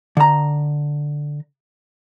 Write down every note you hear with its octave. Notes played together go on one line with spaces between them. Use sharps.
D3 A#5